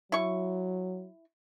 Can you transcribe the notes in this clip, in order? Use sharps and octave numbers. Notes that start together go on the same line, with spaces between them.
F#3 E4 C#6